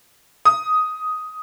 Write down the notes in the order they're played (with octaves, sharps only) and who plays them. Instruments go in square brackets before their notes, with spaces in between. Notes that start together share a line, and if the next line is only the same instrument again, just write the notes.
[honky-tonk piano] D#6